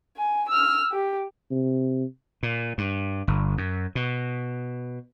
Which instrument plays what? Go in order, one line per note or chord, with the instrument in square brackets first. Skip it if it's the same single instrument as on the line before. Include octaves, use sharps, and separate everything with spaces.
[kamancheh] G#5
E6 F6
G4
[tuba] C3
[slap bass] A#2
G2
G1
F#2
B2